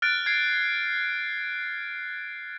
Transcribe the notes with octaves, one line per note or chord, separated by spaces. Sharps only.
F6 F#6 A6 D7
G#6 C7